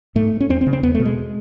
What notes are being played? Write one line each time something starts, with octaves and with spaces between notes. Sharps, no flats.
G#2 A3
C#4
E2 C4
C4
C#3
C4
E2 B3
A3
B2
G#3